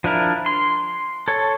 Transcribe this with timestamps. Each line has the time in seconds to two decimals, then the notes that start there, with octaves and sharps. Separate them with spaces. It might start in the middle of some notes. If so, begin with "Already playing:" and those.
0.04 F3 D4 E4 A#4
0.46 C6
1.28 A4 C#5